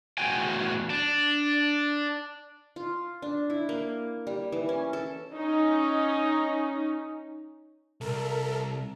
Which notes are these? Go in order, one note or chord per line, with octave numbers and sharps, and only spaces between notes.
E2 A2 F#4 G5 G#5
D4
F4
D4
E4
A#3
G3
E3
C#4
A4
C#4 D#4
C2 A4 A#4